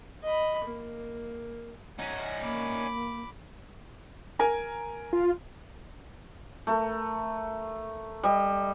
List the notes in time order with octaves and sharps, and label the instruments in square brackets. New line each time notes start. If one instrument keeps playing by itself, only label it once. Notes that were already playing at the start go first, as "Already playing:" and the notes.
[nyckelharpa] D#5 B5
A#3
[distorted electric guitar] C#4 D#4 [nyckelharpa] F#5
[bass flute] A#3 [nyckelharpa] B5 D6
[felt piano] A#4 G#5 A#5
[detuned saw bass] F4
[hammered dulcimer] A3 A#4
G3 D#5